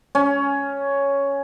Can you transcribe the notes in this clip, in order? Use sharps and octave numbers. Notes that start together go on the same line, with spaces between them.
C#4